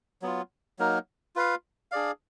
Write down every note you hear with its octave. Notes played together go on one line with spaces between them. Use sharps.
F#3 B3 F4
F#3 A#3 D#4 A#4
F4 B4 F5
D4 G#4 D5 F5